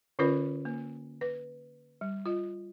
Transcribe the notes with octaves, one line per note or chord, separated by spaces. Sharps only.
D3 C#4 F4 A#4 B4 D5
A#3
B4
G3
F4 D#5